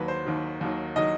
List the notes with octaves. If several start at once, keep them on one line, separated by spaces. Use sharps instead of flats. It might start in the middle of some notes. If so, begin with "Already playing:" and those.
Already playing: D#2 D#3 F#3 B4
C5
D#2 D#3 F#3
D#2 D#3 F#3
D#3 F#3 D#5